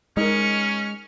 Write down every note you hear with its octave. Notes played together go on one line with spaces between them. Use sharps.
G#3 C#4 D#4 A#4 F6 C#7